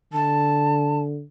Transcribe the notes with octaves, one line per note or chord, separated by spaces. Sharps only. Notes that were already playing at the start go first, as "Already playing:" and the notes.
D3 A5